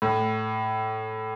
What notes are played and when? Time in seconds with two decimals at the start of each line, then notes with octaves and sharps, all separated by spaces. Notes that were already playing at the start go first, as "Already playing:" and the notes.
0.02 A2